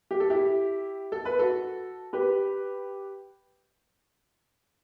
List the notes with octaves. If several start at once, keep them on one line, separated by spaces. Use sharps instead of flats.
G4
A4
E4 G4
A4
B4
F#4 A4
G4 B4